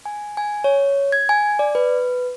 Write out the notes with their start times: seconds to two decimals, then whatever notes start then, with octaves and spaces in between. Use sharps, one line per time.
0.06 G#5
0.37 G#5
0.64 C#5
1.12 G#6
1.29 G#5
1.59 D5
1.75 B4